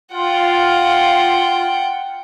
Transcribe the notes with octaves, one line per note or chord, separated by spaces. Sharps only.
F4 F#5 G5